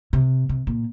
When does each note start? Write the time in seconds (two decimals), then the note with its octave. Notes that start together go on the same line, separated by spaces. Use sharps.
0.13 C3
0.49 C3
0.67 A#2